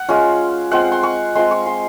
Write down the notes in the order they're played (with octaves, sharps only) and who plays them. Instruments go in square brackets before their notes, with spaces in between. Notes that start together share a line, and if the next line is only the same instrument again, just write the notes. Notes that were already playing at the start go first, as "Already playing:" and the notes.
Already playing: [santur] F#5
G#3 C#4 F4
G#3 C4 F4 F#5
C6
C#6
G#3 C4 F4 C6
C#6
C6